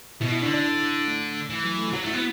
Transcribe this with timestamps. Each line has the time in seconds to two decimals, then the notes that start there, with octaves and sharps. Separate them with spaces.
0.21 B2 E4
0.32 E4
0.42 D3 D4
0.54 D4
1.07 A3
1.50 E3
1.64 F#3
1.78 A3
1.88 E4
1.93 F#3 F#4
2.04 A3 E4
2.14 B3